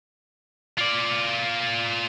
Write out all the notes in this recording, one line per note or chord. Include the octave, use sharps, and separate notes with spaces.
F4 D5